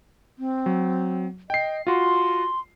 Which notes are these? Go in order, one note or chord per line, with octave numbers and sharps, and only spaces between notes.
C4
F#3
D#5 G5 C7
F4 F#4 C6